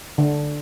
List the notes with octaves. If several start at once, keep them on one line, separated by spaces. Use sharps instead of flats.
D3